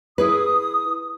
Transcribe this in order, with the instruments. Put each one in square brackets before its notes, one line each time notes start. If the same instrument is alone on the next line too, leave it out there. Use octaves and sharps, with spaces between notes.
[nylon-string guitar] E4 G#4 B4 [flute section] D#6